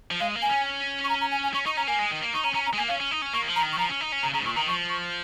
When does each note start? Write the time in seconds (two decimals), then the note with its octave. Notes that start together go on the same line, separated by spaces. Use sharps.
0.11 F3
0.20 G#3 F5
0.36 A#3
0.42 G#5
0.50 C#4
1.04 C#6
1.09 A#5
1.21 A#5
1.32 G#5
1.43 G#5
1.54 C#4 C#6
1.66 D#4 C#6
1.77 C#4 A#5
1.87 A#3 G#5
1.99 G#3
2.11 D#3
2.22 A#3
2.33 D#4 C#6
2.44 C#4 A#5
2.54 C#4 A#5
2.66 A#5
2.73 G#3
2.78 A#3 G#5
2.88 C#4 F5
3.00 C#4
3.11 D#4
3.22 C#4
3.33 A#3 C#6
3.42 D#3
3.48 F3
3.56 A#5
3.63 D#3
3.73 C#6
3.78 F3 A#5
3.89 C#4
4.01 D#4
4.12 C#4
4.23 C#3 A#5
4.34 C#3 A#5
4.41 G#2
4.46 A#2 C#6
4.56 D#3 A#5
4.67 F3 C#6
4.90 C#6